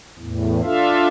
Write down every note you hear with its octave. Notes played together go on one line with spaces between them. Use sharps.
E2 A2
D4 F4 A4 E5 F5